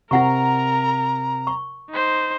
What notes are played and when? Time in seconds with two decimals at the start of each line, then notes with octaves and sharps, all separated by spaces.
0.11 C3 E4 A#4 F#5 A#5 C#6
1.47 C#6
1.90 D#4 C5